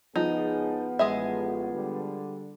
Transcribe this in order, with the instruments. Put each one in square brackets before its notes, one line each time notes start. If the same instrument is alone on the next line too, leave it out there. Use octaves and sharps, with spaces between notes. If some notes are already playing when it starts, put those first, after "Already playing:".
[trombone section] C#2 G#4 [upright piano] F3 [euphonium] B3 [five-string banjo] D#4
[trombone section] A1 [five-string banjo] G#3 G#4 E5
[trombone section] D3 G3